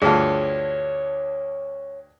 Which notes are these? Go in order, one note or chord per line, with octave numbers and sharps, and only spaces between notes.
D2 G2 F4 G#4 C#5 A5